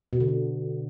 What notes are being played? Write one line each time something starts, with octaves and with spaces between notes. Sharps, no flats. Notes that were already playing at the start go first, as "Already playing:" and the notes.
B2
D3
B2